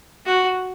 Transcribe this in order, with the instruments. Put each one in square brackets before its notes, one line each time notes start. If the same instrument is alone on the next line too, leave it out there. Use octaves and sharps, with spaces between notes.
[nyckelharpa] F#4